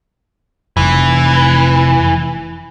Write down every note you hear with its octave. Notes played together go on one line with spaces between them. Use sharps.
F1 E3